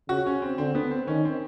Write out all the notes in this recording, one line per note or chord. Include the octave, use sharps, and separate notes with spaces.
C#3 F#4
C#4
C4
D3 C4
B3
C4
D#3 C#4
C4